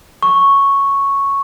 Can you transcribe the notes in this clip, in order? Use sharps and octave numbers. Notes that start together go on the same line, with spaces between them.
C#6